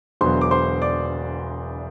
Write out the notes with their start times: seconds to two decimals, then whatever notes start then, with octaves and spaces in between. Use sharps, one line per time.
0.21 E1 E2 D3 F#3 B3 C5 C6
0.41 D6
0.51 C5 C6
0.82 D5 D6